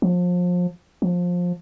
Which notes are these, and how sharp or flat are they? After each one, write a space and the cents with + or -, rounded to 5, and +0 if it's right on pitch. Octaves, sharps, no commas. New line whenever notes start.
F3 +30
F3 +20